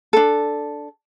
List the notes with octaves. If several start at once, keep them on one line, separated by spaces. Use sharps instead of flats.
D4 A4